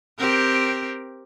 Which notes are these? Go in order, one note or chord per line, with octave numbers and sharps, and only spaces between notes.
C4 G4 A#4